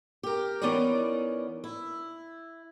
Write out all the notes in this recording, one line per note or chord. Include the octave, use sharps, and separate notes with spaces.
G4 A#4
E3 B3 C#4 D#4 A#4 D5
E4